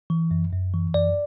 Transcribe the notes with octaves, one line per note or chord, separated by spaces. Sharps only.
E3
F#2
F#2
E3
F#2 D5